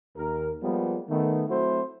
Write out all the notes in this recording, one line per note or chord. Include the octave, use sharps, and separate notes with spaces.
D#2 A#4
F3 G3 G#3 A#3 B3
D#3 A3 B3
F#3 A3 C4 E4 F#4 C5